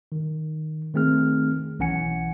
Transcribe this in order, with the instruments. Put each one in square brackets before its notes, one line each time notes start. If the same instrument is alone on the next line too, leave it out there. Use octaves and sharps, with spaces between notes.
[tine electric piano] D#3
D#3 A3 C4 G#4 F6
B1 E3 C#4 F#5 G#5 C#7